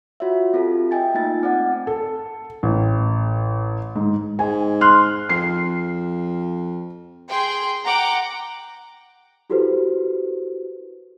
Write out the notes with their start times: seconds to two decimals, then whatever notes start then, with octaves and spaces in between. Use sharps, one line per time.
0.20 F4 F#4 C#5 E5
0.54 C4 F4 G4 A4
0.91 D#5 E5 G5 G#5 A6
1.14 A3 A#3 D#4 F4 A6
1.43 C4 D5 F#5
1.87 A4
2.63 A1
3.96 G#2
4.39 G#2 G#5
4.81 C6 F6 F#6
5.29 F2 C7
7.28 G#4 G5 C6
7.84 F#5 G5 A#5 D6
9.50 E4 F#4 G4 A4 B4 C5